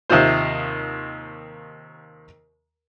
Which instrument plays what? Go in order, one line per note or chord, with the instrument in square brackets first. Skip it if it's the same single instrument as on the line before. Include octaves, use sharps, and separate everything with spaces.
[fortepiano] D#2 C3 D#4 F4 C5